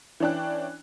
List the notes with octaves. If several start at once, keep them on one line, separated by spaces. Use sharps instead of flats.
E3 C#4 D4 G5 F#6